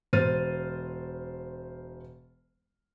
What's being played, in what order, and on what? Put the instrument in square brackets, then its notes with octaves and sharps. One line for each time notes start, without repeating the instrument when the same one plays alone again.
[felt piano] E1 C5 F6 A6 D#7